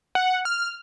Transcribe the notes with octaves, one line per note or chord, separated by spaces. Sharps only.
F#5
F6